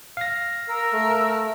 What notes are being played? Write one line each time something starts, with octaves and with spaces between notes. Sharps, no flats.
F5 A#6
A#4 E6
A3